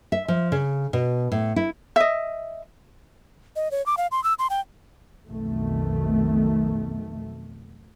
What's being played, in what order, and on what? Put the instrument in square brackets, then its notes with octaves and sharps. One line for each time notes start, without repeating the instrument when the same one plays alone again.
[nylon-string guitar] E5
F3
C#3
B2
A2
E4
[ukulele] D#5 E5
[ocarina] D#5
C#5
D6
F5
C6
E6
C6
G5
[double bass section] B1 F2 B2 D#3 A3